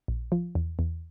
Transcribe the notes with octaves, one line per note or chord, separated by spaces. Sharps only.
A#1
F3
E2
E2